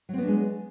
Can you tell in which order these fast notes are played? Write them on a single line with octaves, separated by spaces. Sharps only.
F#3 C4 B3 D4 G#3